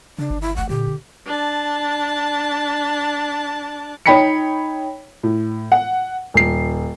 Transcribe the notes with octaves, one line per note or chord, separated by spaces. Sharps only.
C#3 D4
G1 D#3
E4
E3 A3 F#5
A#2 D3 G4
C#3
D4 A5
D#4 C#5 G5 B5 B6 C#7
A2
F#5
D#1 C7